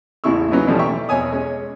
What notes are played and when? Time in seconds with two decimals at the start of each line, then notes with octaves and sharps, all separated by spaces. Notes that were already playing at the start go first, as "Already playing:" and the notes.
0.24 A1 E2 C#3 E4 C#6 E6
0.51 C#3 F#3 B3 C#4 D#4
0.67 B2 E3 F3 G3 A3 C#4
0.79 D5 E5 G5 A#5 C#6
1.09 E2 B2 C#5 G#5 D#6
1.32 G#3 C#4 C#5